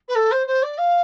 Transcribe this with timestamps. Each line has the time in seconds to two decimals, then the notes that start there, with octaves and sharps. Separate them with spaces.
0.08 B4
0.15 A4
0.31 C5
0.47 C5
0.62 D5
0.78 F5